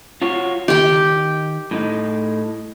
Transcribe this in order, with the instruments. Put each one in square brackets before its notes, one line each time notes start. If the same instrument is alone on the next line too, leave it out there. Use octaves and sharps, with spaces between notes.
[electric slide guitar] F4 F#4 C#5
[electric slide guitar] D#3 [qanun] G4 G5
[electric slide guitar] A2 D#4